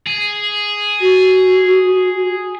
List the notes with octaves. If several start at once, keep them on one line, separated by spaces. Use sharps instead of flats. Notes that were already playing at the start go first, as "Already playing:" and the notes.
G#4
F#4